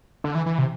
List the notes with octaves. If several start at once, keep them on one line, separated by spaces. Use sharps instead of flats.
D3
E3
E3
C3